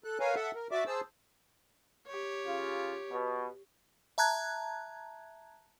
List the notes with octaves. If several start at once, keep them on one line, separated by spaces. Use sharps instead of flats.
A4 F#6
A#4 B4 C#5 F5 G#5
A4 E5 F#5
A#4
F#4 D5 E5 D6
G#4 C5 A5 E6
G4 C#5
C#3 F4
B2
E5 A5 A#5 F#6 G#6